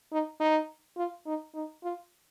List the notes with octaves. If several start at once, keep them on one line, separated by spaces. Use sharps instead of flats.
D#4
D#4
F4
D#4
D#4
F4